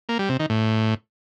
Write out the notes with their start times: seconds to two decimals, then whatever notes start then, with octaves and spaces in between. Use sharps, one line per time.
0.09 A#3
0.19 G3
0.29 C3
0.40 D#3
0.50 A2